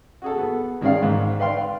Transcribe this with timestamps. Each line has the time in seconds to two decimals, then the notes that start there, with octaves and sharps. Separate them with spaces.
0.22 F#4 G#4 A4
0.38 B3
0.81 D#3 G#3 C#4 D5 F5
1.02 G#2 D#3
1.40 B4 D5 F5 G5 C6